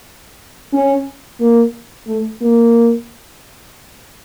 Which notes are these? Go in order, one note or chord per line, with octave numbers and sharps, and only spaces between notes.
C#4
A#3
A3
A#3